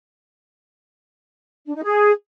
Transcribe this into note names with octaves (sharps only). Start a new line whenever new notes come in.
D4
D#4
G#4